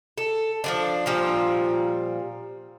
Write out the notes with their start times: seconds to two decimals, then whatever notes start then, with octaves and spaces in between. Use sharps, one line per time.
0.18 A4
0.64 F3 G#3 D4
1.06 A#2 F3 G3